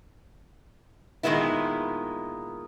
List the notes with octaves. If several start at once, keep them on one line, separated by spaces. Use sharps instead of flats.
A#2 D#3 F3 G#3 B3 E4